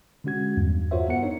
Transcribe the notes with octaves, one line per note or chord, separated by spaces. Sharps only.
D3 G#3 C#4 F#4 G#6
E2 G2
F4 F#4 A#4 C5 C#5 E5
B3 A#4 F#5 C#7
D4 D#4 C#5